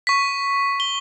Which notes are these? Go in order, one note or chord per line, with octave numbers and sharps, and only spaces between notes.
C#6 B6
G7